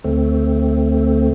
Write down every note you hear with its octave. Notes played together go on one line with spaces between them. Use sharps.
D2 A3 C4